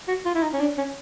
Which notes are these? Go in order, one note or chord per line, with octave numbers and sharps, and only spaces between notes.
F#4
F4
E4
D#4
C#4
D4
C#4